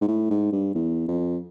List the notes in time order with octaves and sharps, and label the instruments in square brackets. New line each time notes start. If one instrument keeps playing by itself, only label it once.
[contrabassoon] G#2
A2
G#2
G2
E2
F2